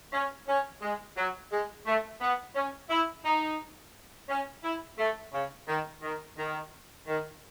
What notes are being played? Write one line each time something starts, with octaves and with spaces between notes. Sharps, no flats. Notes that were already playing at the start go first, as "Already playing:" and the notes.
C#4
C#4
G#3
F#3
G#3
A3
B3
C#4
E4
D#4
C#4
E4
A3
C#3
D#3
D#3
D#3
D#3